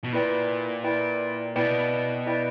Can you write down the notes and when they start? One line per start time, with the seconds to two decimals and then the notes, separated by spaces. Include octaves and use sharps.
0.04 B2
0.12 A#2 E4 B4 D5 G5
0.84 E4 B4 D5 G5
1.56 B2 E4 B4 D5 G5
2.26 E4 B4 D5 G5